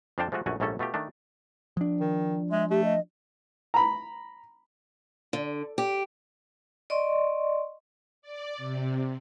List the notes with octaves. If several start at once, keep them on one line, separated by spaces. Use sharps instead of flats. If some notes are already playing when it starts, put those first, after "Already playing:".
F2 F3 D4 F5 G5 A5
F3 G#3 A3 F4 F#4
A#1 F#2 A3 F#4 G#5
A#1 G#2 G3 A3 C#4 A4
B2 A3 F4 G4
D#3 A3 D4
F3 D4
D#3
G#3 E5
A3 G4
D#5
A#5 B5
D3
G4
D5 D#5 C6 C#6
D5
C3